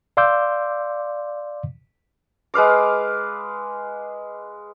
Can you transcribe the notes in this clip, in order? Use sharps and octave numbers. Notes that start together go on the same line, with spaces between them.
D5 F5 C6 D6 E6 G6
G#3 B4 F5 D6